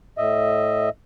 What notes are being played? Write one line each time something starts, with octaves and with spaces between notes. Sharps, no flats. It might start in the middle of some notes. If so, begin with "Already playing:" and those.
A2 D#5 E5